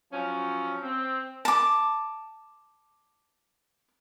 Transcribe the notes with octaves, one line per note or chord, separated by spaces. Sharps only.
F3 F#3 C#4
C4
A5 D6